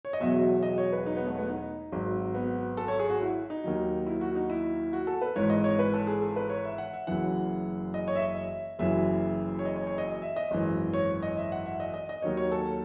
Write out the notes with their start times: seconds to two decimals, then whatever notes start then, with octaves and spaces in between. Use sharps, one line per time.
0.05 C#5
0.13 D#5
0.20 E1 E2 B2 F#3 E5
0.63 D#5
0.78 C#5
0.92 B4
1.06 D#4
1.16 B3
1.27 A3
1.38 B3
1.49 D#4
1.92 G#1 G#2 F#3
2.34 B3
2.77 A4
2.88 C#5
2.99 G#4
3.10 F#4
3.21 E4
3.50 D#4
3.64 D#2 D#3 F#3
4.07 E4
4.21 F#4
4.35 D#4
4.50 E4
4.93 F#4
5.07 A4
5.22 B4
5.36 G#1 G#2 E3 C#5
5.50 D#5
5.64 C#5
5.79 B4
5.94 A4
6.07 G#4
6.22 A4
6.36 B4
6.50 C#5
6.65 E5
6.78 F#5
6.93 E5
7.07 F#1 F#2 E3 F#5
7.94 D#5
8.08 C#5
8.16 E5
8.21 D#5
8.36 E5
8.79 F#1 F#2 E3 E5
9.59 C#5
9.65 D#5
9.76 C#5
9.87 C#5
9.98 D#5
10.22 E5
10.36 D#5
10.51 G#1 F#2 E3
10.94 C#5
11.23 D#5
11.37 E5
11.52 F#5
11.66 E5
11.80 D#5
11.94 D#5
12.09 D#5
12.22 D#2 D#3 F#3 C#5
12.37 C#5
12.52 A4